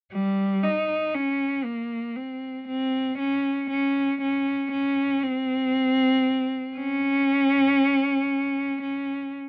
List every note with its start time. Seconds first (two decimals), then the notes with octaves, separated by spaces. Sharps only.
0.13 G3
0.63 D#4
1.14 C#4
1.65 A#3
2.16 C4
2.68 C4
3.19 C#4
3.70 C#4
4.21 C#4
4.72 C#4
5.23 C4
6.77 C#4
8.81 C#4